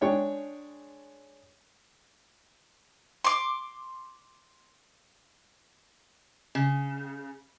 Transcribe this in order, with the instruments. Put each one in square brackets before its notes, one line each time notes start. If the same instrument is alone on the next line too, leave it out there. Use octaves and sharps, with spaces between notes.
[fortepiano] G#3 D4 C#5 G5
[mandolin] C6 D6
[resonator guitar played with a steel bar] C#3